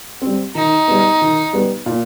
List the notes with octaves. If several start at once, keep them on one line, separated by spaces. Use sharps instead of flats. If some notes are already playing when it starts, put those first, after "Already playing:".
C4
G3
D#3 D#4
G3 B3
D#3
G3 B3
A#2